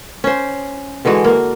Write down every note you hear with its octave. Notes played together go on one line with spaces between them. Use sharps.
C#4 C5
D3 E3 G#3 F#4
A#3